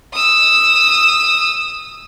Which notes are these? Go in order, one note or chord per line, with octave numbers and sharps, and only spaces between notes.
D#6 E6